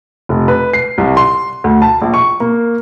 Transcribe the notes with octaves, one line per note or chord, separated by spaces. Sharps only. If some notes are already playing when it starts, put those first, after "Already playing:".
F1
B4
C7
C2
C6
D2
A5
A#1
C#6
A#3